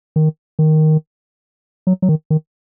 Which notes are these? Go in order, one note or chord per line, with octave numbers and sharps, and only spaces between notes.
D#3
D#3
F#3
F#3
D#3
D#3